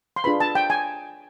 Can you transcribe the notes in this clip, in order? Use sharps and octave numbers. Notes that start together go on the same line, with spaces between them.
C6
D4 F4 G#4 B4 B5
A5
G5
G#5